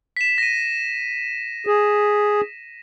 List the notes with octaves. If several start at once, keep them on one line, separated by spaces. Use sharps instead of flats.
B6 E7
A#6 D#7
G#4